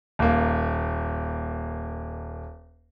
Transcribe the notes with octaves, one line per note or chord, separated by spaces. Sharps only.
D#1 A#3